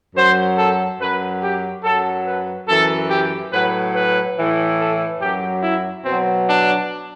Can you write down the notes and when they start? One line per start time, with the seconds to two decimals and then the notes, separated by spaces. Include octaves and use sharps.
0.16 F#2 F#3 C5
0.58 A4
1.00 F#2 F#3 B4
1.42 G4
1.84 F#2 F#3 A4
2.26 B4
2.68 F#2 E3 A4
3.11 G4
3.52 A2 F#3 B4
3.95 B4
4.38 A2 E3
4.80 A4
5.21 F#2 F#3 G4
5.63 E4
6.05 B2 F#3 C4
6.48 D4